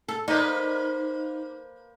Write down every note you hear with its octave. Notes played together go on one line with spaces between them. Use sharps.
A4
A#3 D#4 B4 C5